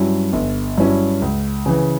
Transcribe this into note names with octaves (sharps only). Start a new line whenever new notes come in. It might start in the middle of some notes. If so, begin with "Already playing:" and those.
Already playing: G2 F#3 C#4 E4
G1
G2 F#3 C#4 E4
C#2
C#3 E3